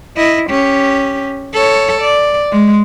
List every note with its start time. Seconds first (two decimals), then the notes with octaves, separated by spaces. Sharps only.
0.17 E4 D#5
0.50 C#4 G4
1.53 A4 C#5
2.01 D5
2.52 G#3